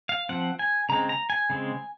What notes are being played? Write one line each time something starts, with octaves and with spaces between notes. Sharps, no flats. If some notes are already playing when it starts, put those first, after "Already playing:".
F5
F3 C4 F#5
G#5
C#3 G#3 C4 A#5
A#5
G#5
C#3 G#3 C4